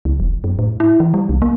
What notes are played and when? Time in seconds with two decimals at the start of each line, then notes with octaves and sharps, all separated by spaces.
0.05 C#2
0.20 E1
0.44 F#2
0.59 A2
0.80 E4
1.00 E3
1.14 G3
1.29 C2
1.42 A#3